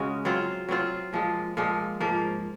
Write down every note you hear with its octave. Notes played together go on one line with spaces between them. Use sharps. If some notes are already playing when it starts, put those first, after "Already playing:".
Already playing: C#3 G#3 C#4 F#4
F#3 C4 F4
F#3 C4 F4
A#2 F3 G#3
A#2 F3 G#3
G#2 F3 A#3